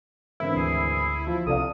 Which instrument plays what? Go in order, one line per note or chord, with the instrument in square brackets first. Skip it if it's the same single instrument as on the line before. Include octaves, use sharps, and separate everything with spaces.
[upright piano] G#1 D3 E3 [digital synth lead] E4
[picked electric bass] D2 [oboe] G#4
[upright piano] F3
[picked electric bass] C2 C3 [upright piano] A4 D5 F5 [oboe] D#6